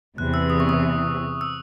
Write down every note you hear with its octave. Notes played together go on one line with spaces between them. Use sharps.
E2 C3 E3 F#6
E6
D#6
C#6
D#6
E6